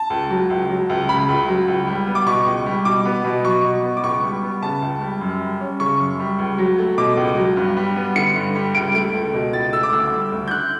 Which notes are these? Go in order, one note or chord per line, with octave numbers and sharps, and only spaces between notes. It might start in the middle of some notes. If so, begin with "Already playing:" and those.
Already playing: A5
C#2
F#3
C#2
F#3
C#2
C#3 B5
C#2
F#3
C#2
G3
B3
D6
B2 C#6
C#2
G3
B2 D6
B3
B2
F#3 C#6
B2
B3
D6
C#2 C#6
G3
B3
C#3 A5
C#2
G3
F#2
G3
C#4
C#3 C#6
F#2
G3
C#2
F#3
A3
B2 D6
C#2
F#3
G2
G3
B3
D3 C#7
G2
G3
C#2 D7
A3 D7
C#2
B2
C#2 A6
A3 E6
D6
D2 E6
G3
D2
G6
D3 F#6